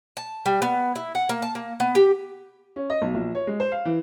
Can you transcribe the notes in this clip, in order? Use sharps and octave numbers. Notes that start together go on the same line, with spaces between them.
A5
G3
B3
E4
F#5
A#3
A5
A#3
B3
G4
C#4
D#5
B1
A#1
C#5
G#3
C5
F5
E3